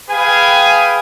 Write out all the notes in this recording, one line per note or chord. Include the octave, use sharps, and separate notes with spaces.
G#4 B4 F5 G5 G#5